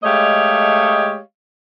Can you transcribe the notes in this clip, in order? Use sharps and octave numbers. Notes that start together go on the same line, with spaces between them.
G#3 A3 G4 C#5 D#5 F5